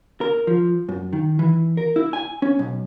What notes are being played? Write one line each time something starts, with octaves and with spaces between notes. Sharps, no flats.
A#4
F3
F#2
D#3
E3
A#4
E4
G#5
C#4
B1